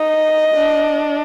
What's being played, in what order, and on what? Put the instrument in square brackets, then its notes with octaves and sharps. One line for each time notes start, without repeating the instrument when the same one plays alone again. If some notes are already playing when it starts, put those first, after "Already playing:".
Already playing: [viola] D#4 [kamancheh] D#5
[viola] D4